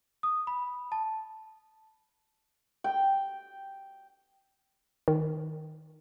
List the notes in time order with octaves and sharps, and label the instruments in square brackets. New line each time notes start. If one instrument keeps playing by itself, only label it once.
[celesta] D#6
B5
A5
[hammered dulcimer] G5
[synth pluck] D#3